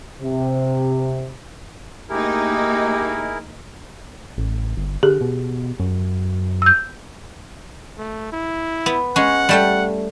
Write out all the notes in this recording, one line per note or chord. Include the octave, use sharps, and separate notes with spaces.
C3
A3 A#3 D#4 E4 G4 G#4 A#4
A1
G1
D3 G4 G#4
B2
F#2
E6 G6
A3
E4
B3
G#3 C#4 F#5
G3 A3 G5